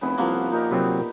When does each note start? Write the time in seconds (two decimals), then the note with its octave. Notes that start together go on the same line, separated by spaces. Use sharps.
0.01 F1 C#3 B3 E4
0.18 C2 F3 A#3 F#5 C#6
0.52 A#2 D#4 G4 A#4
0.71 C3 F#3 B3 C4